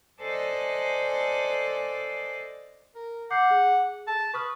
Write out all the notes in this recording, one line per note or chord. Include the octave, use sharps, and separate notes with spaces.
A4 C5 D5 D#5 G#5 F#6
A#4
F#5 D6 G6 C7
G#4
A5
B4 C#6 D#6 F6